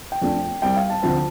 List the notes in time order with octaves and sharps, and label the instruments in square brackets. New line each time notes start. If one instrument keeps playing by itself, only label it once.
[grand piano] G5
F2 F3 A3 D4
C2 C3 G3 G5
F5
A5
D2 D3 F3 C4 A5